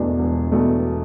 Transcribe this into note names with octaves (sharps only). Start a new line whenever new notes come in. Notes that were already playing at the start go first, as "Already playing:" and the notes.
Already playing: E1 E2 B2 A3 D4
E1
E2 B2 A3 D4